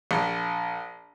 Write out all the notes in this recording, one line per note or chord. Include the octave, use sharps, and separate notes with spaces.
A#1